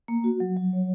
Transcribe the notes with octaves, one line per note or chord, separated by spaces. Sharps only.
A#3
F#4
F#3
F#3
C#5